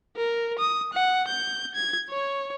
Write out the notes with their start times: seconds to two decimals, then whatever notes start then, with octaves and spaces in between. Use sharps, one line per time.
0.17 A#4
0.59 D#6
0.93 F#5
1.28 G6
1.75 G#6
2.10 C#5